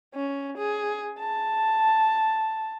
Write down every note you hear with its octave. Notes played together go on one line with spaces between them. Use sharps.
C#4
G#4
A5